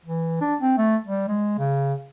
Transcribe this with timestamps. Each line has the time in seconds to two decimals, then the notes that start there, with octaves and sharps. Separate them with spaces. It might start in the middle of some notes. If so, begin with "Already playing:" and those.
0.05 E3
0.41 D4
0.61 C4
0.77 A3
1.05 G3
1.28 G#3
1.58 C#3